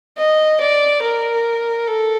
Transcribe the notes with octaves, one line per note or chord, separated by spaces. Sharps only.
D#5
D5
A#4
A4